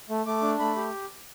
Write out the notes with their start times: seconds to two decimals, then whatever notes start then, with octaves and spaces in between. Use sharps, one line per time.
0.09 A3
0.26 A3 D6
0.42 D4
0.59 A3 B5
0.76 G4